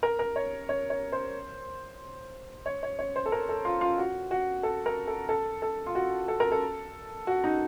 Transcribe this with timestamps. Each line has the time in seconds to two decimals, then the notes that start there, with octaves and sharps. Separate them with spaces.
0.03 A#4
0.19 A#4
0.36 C#5
0.69 C#5
0.90 C#5
1.12 C5
2.66 C#5
2.83 C#5
2.99 C#5
3.16 C5
3.26 A4
3.32 A#4
3.49 A4
3.65 F4
3.81 F4
3.98 F#4
4.31 F#4
4.63 A4
4.86 A#4
5.08 A4
5.29 A4
5.62 A4
5.86 F4
5.95 F#4
6.28 A4
6.40 A#4
6.52 A4
7.27 F#4
7.44 D#4